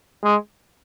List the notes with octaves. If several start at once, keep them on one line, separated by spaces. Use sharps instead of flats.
G#3